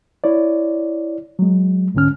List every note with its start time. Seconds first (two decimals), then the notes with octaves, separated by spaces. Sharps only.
0.24 E4 C#5 D5
1.39 F#3 G#3
1.94 C2 G#2 D3 C#4 F6